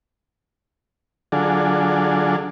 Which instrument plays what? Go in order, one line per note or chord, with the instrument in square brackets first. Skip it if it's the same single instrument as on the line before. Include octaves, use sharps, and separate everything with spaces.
[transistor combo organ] D3 F#3 D4 F4 G#4 A4